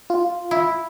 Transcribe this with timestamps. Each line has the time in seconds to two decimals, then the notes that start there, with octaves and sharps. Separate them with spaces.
0.10 F4
0.51 E4